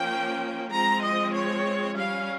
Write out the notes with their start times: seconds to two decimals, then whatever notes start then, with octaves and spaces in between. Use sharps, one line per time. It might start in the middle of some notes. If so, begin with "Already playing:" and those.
Already playing: F3 A#3 C#4 G5
0.70 F3 G#3 C4 A#5
1.02 D#5
1.33 C#5
1.96 G3 C#4 F5